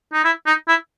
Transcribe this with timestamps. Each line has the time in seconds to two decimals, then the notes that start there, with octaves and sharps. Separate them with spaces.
0.13 D#4
0.24 E4
0.46 D#4
0.68 E4